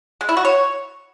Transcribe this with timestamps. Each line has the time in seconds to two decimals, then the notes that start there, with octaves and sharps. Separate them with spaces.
0.21 G#3
0.29 E4
0.37 F#4
0.45 C#5